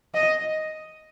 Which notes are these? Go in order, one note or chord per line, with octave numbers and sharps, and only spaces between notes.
D#5